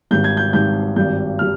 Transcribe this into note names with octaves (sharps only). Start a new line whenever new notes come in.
G#1 G#2 G3 G6
G#6
G6
G#1 G#2 G3 G6
G#1 G2 G3 G6
G3 F6